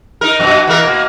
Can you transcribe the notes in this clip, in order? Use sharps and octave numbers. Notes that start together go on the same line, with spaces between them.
D#4 A#4
F#2 B2
E3 A#3 A#4
B2 A#3